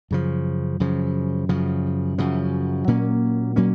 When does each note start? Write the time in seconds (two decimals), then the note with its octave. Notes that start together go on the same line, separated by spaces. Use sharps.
0.11 F#2 C#3 F3
0.80 F#2 C#3 F3
1.49 F#2 C#3 F3
2.18 F#2 C#3 F3
2.87 A#2 F#3 A#3 C#4
3.56 A#2 F#3 A#3 C#4